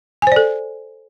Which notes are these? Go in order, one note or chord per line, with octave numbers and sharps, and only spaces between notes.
A4 C5 D5 G#5